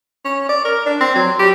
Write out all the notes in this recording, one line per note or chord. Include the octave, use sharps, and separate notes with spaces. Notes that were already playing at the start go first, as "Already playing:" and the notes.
C#4
D5
A#4
D4
C4
F#3
G4